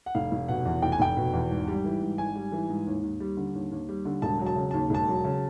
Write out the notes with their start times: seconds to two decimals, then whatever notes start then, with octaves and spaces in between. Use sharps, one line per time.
0.06 F#5
0.15 F1 F5
0.32 F1
0.48 B2 F#5
0.66 E2
0.82 F1 G5
0.92 G#5
1.00 F1 G5
1.17 B2
1.33 E2
1.50 G#1
1.68 G3
1.84 E3
2.02 G#2
2.18 G#1 G#5
2.36 G3
2.52 E3
2.69 G#2
2.87 D#2
3.03 D#2
3.20 G3
3.37 D3
3.54 D#2
3.72 D#2
3.89 G3
4.05 D3
4.22 E1 A5
4.39 F#3
4.46 A5
4.56 C#3
4.71 D#2 A5
4.90 E1 A5
5.08 F#3
5.24 C#3